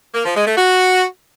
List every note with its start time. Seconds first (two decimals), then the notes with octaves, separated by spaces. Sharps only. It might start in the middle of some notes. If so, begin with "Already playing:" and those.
0.15 A#3
0.25 F3
0.36 G#3
0.46 A3
0.57 F#4